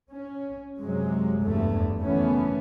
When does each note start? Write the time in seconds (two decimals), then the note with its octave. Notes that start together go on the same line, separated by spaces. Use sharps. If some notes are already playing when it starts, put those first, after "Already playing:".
0.11 C#4
0.81 F#2 C3 F#3 G#3
1.42 F1 E2 G2 A3
2.01 F#1 D#3 E3 A3 B3 C#4